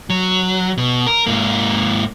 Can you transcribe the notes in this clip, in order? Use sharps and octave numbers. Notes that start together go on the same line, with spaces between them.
F#3
B2
A#4
G#2 A#3